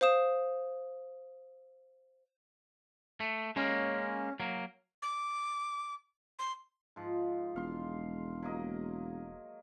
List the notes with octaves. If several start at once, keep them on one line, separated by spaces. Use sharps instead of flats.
C5 F5 D#6 E7
A3
G#3 A#3 C#4
F#3 A#3
D6
C6
G#2 F3
E1 F5 C6
F#3 A#3 D#5